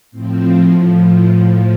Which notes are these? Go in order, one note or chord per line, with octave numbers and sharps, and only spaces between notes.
A2 F3 C4